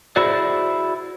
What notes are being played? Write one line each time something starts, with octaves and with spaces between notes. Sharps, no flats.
E4 F#4 G#4 C5 D5